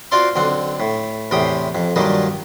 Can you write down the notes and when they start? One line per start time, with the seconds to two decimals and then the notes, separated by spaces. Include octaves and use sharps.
0.12 F4 F#4 C5 D5 F5 C6
0.36 B1 D3 C4 F#5
0.80 A2
1.31 E2 A2 C3 G4 G5 D#6
1.75 F2
1.96 G2 A#2 D#3 F#3 G3 D#4